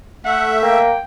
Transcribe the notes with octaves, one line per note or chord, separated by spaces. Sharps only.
A3 E5 F#5
A#3 G5